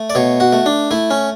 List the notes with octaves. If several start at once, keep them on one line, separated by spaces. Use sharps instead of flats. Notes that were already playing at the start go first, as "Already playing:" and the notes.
Already playing: A3
D5
B2 C#5
F#4
A3
D4
A3 E4
C#4